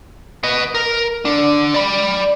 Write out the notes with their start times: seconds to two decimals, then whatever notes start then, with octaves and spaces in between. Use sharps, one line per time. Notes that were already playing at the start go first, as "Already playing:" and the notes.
0.43 B4 D#5
0.74 A#4
1.25 D3 D4
1.74 D5 B5